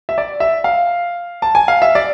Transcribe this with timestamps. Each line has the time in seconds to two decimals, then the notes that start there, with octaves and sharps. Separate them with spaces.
0.09 E5
0.18 D5
0.40 E5
0.64 F5
1.42 A5
1.55 G#5
1.68 F5
1.82 E5
1.95 D5